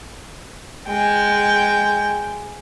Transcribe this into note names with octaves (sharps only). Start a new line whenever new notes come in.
G#3 G5